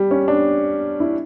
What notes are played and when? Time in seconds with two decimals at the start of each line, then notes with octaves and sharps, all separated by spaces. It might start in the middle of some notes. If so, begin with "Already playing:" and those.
Already playing: G3
0.11 C#4
0.28 D4
1.00 E4